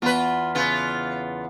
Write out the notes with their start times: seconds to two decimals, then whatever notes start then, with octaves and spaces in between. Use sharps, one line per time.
0.02 E2 F4 B4
0.55 C#3 B3 F4